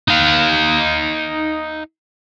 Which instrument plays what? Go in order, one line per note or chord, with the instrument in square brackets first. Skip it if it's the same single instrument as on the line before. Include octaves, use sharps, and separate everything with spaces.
[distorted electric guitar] D#4 F5